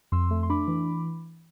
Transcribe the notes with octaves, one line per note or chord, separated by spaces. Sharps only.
F2 C6 E6
A3
C6
D4 B5 D6
E3